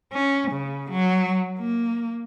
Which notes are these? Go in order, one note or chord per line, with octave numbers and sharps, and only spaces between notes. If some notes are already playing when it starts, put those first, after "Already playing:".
C#4
C#3
F#3
A#3